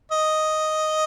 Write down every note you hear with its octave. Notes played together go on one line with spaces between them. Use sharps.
D#5